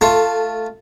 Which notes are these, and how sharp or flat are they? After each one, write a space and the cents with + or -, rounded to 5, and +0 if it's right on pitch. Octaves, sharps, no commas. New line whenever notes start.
A3 +0 F4 +0 A4 +20